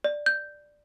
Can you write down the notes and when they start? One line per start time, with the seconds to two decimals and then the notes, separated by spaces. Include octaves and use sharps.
0.04 D5
0.26 G6